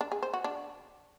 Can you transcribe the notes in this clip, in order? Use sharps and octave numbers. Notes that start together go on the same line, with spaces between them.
D4
G#4
C5
F#4
D4